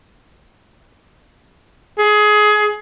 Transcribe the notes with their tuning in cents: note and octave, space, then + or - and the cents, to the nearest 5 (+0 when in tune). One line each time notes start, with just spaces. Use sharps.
G#4 +20